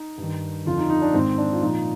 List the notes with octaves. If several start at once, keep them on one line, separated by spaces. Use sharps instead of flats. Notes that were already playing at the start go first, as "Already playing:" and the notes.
Already playing: D#4
G2
D#3
F2 D3 F3 F4
D#4
D#4
D4
G#2 D#3 C4
D4
F4
A#2 F3 D#4